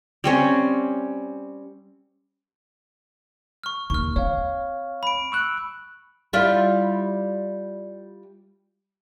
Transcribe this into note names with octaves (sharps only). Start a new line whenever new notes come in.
G3 C4 C#4
C#6 F6
D#2 C#6 F6
C4 C#5 F5
B5 D7
C#6 E6 F#6
G3 E4 F4